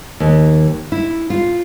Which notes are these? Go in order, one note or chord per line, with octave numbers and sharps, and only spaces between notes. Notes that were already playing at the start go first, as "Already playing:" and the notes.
D#2
E4
F4